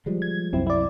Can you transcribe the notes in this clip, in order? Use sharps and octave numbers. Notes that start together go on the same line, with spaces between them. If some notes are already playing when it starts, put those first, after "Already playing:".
F3 G3 G#3
G#6
C2 F#2 C4 E4
E4 D5